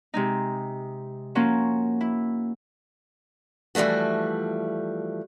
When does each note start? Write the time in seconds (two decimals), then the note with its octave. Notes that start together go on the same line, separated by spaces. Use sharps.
0.14 C3 G#3 D#4
1.35 F3 A#3 C#4 F4 F#4
2.01 E4
3.75 E3 F3 G3 A3 F#4